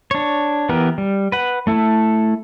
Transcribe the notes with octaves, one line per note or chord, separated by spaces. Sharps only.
D4 C#5
E3 B3 G4 A#4
G3
B4 F#5
A3 E4 A4